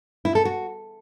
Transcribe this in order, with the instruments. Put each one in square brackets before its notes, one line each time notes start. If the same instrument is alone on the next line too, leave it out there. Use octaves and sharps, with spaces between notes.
[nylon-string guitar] E4
A4
F#4